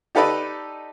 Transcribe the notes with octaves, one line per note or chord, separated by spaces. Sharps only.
D#4 G4 A4 B4 D5 D#5